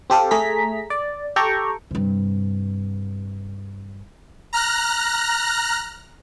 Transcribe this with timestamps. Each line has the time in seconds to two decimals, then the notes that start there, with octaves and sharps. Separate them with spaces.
0.10 C4 G4 A4 F5
0.31 A3 G#4 A#5 B6
0.90 D5
1.36 G4 A4 G5 A#5 C#6
1.91 G2 C3
4.53 A#5 F6 F#6 A#6